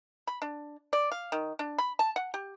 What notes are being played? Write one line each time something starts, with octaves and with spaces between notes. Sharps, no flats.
B5
D4
D5
F5
D#3
D4
B5
A5
F#5
G4